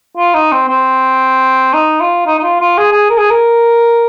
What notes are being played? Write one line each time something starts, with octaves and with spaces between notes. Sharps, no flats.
F4
D#4
C4
C4
D#4
F4
D#4
D#4
F4
F4
G#4
G#4
A#4
G#4
A#4